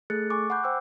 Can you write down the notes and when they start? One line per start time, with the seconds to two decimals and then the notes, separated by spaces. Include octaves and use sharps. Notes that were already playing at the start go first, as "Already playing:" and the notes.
0.10 A3 G#4 A4 F#6 A6 C#7
0.30 G#5 C#6 D6
0.50 F#5 G#5 B5 D6 F#6 G6
0.64 C5 G5 E6